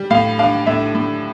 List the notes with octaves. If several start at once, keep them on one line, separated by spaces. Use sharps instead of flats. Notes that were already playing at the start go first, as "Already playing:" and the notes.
Already playing: G3
A2 F5
D4 F5
A2 E5
A2